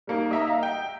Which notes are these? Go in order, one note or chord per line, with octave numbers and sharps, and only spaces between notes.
G3 A#3 D#4
D#5 E5 A#5
F5
G5